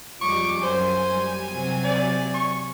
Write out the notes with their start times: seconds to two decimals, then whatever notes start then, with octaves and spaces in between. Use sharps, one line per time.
0.21 F2 G3 G#3 C#6 D6
0.63 F#2 C5 G#5
1.12 G3
1.52 C3 F#3 C4
1.84 D5
2.34 C#6